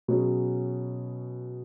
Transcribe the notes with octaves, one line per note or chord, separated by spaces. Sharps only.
B2 F#3 C#4 G#4